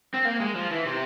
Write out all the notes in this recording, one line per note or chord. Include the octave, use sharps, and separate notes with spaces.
C4
A#3
G#3
F3
E3
C3